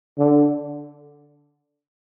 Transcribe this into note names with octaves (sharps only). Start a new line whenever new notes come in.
D3